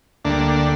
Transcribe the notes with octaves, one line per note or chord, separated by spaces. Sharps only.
D2 D3 G3 A#3 D4